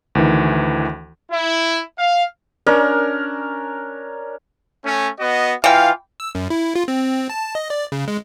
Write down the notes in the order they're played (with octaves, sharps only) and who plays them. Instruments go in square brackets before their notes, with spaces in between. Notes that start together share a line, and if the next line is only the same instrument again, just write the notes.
[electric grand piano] D2 D#3 E3
[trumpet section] E4
F5
[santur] C#4 D4 A#4
[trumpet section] A3 C#4
B3 F#4 D#5
[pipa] E3 G5 [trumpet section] F4 F5
[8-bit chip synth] E6
F#2
E4
F4
C4
A5
D#5
D5
C#3
G#3